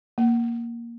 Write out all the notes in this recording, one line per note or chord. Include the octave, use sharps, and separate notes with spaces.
A#3